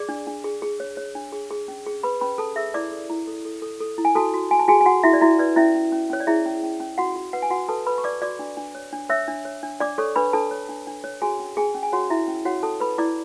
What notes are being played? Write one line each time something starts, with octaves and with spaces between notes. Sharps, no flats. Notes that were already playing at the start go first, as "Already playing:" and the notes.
Already playing: G#4 D5 D6
D4
D4
G#4
G#4
C#5
C#5
D4
G#4
G#4
C#4
G#4
G#4 B4 B5
C#4 B4 B5
G#4 A4 A5
G#4 E5 E6
E4 D5 D6
A4
E4
A4
A4
A4
A4
E4
G#5
F#4 A4 A5
F#4
F#4 G#5
A5
F#4 G#4 G#5
G#5
F#4 F#5
E4 F#4 E5
D5
E4 F#4 E5
B4 D5
C#4 E4 E5
C#4
C#4
C#4 C#5
D5
E4 G#4 E5
C#4
C#4
C#4
F#4 F#5
F#4
B4 F#5
G#5
F#4 F#5
A4 B4 A5
B4 B5
C#6
B4 D5 D6
F#4 D5 D6
D4
D4
C#5
D4
C#5 E5 E6
D4
C#5
D4
D4 D5 D6
A4 C#5 C#6
D4 B4 B5
D4 A4 A5
C#5
D4
D4
C#5
F#4 G#4 G#5
C#4
C#4 G#4 G#5
C#4
G#5
F#4 C#5 F#5
E4 F#4 E5
C#4
F#4 C#5 F#5
C#4 A4 A5
A4 B4 B5
E4 D5 D6